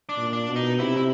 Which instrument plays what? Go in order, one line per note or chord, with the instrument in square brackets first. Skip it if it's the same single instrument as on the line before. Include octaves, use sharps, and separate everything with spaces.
[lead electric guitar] D4
[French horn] A#2
[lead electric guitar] D4
[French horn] B2
[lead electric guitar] D#4
[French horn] C3 [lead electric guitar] E4
[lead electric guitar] E4